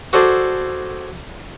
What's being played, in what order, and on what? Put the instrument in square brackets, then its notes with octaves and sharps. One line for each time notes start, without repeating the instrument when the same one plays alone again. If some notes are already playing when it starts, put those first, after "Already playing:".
[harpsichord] F#4 G#4 A4 C5 D5